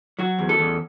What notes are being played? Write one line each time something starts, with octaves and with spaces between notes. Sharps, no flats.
F#3 F#4
E2
A4
E2